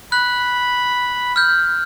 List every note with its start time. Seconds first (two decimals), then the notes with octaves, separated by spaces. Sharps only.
0.12 B5 F#6
1.36 F6 G6